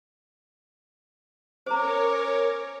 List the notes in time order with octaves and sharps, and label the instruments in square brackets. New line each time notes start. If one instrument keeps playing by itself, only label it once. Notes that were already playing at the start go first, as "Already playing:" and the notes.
[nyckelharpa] C#4 D6 [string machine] A#4 C#5 [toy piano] C5 A#5